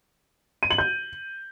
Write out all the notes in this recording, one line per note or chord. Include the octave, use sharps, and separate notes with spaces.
D#7
F#7
G6